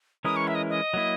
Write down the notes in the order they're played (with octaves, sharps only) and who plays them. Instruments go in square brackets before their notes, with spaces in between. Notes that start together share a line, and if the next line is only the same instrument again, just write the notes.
[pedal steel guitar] E3 G#3 C#4 E4 A#4 [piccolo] D#6
[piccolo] C#6
E5
D#5
D#5
[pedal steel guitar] F#3 A#3 E4